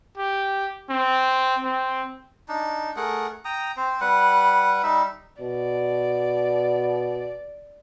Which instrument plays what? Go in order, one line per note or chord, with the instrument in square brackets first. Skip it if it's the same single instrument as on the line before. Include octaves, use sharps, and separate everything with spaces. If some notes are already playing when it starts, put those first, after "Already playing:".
[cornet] G4
C4
C4
[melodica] D4 D#4
A3 G#4 A#4 F#5
G5 A#5 D#6
C4 C5
G3 B4 F#5
G3 D#4 E5
[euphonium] B2 [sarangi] D5